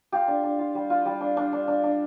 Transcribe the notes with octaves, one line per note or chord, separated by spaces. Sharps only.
F4 G4
D4
D4
F4
G3
F4
G3
D4
D4
D4
D4
D4